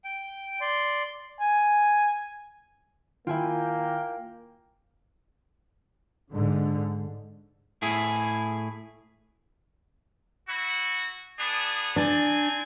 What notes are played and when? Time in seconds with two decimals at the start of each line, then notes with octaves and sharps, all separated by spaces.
0.04 G5
0.61 D5 C6
1.40 G#5
3.27 D#3 A#3 E4 F4 G5 G#5
6.33 G#2 D3
7.82 A2 E4 G#4
10.48 E4 F#4
11.39 B3 D4 G#4
11.96 C4 D4 G#5